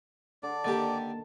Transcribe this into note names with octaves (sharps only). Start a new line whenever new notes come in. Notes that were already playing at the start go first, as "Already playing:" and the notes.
D3 D5
D3 D#3 A#3 G4 A5 A6